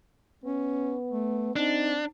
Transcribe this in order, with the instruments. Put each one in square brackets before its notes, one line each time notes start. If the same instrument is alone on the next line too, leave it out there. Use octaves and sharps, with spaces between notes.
[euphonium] B3 [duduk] C#4
[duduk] A3
[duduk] C4 [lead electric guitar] D4 [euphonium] D#4